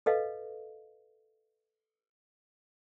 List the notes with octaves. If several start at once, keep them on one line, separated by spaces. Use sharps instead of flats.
A4 B4 D#5 F5